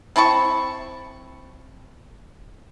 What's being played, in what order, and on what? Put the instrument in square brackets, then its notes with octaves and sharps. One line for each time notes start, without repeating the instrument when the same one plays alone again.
[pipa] C4 E4 A5 C#6